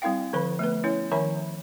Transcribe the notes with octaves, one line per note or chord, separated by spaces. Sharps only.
G3 C4 E4 F5 G5
D3 F3 B4 B5
A3 B3 B4
C#4 E4 C#5
D#3 F3 C#5 E5 G#5 B5